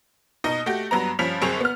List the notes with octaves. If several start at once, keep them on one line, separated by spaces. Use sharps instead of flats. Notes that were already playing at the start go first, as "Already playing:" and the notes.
B2 D#4 D#5 A#6
A3 F#4 G4
G2 F#3 B3 A#5
G2 F3 C#4 B6 F7
G1 F#2 C4 G#4 C#6 F7
B3 F6